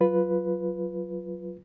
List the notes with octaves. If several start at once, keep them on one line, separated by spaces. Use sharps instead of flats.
F#3 F4 B4